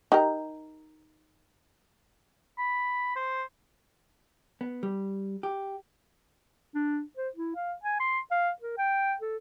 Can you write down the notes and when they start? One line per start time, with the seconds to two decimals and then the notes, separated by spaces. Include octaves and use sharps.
0.12 D#4 G4 A#4
2.58 B5
3.16 C5
4.61 B3
4.83 G3
5.43 G4
6.75 D4
7.17 C5
7.36 E4
7.56 F5
7.84 G#5
8.00 C6
8.31 F5
8.62 A#4
8.78 G5
9.21 A4